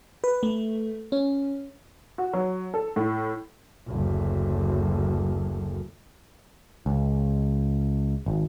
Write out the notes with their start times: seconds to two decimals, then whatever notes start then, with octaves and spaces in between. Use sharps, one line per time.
0.24 B4
0.43 A3
1.12 C#4
2.18 F#4
2.33 F#3
2.74 A4
2.96 A2
3.88 F#1 D2
6.86 C#2
8.26 G#1